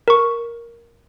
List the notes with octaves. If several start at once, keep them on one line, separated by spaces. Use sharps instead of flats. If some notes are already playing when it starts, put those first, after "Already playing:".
A#4 C#6